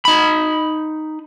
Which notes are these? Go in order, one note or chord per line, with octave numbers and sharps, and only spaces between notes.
D#4 B5